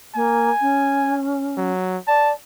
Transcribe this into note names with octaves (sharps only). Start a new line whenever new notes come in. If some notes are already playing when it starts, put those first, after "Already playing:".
A#3 G#5
C#4
F#3
D5 A5